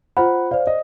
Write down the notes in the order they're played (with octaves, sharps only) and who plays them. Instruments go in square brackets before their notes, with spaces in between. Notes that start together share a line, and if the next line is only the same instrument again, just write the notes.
[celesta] F4 C5 B5 [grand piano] F#5
[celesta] C5 D5 [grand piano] F5
[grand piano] D#5